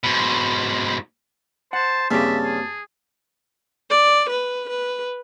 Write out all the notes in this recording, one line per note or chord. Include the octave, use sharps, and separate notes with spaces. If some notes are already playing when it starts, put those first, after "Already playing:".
G#2 B2
C5 F#5 A5
G2 C#3 A#3 C4 G4 E5 A5
G#4
D5
B4
B4